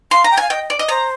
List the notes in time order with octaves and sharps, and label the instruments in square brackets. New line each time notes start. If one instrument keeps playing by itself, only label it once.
[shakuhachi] F5 [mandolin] C6
[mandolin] A#5
[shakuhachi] G5
[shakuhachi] F5 [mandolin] G#5
[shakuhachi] D#5 [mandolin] G5
[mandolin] D5
D#5
[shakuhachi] C5 [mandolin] A#5